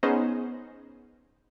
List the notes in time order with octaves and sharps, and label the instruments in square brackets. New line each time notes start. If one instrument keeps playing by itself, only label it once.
[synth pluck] B3 C#4 D#4 G#4 C5 D#5